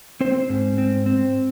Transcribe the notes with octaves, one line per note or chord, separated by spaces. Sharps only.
C4 C5
G#2
C4
C4